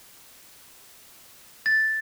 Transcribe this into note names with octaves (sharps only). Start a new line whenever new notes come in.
A6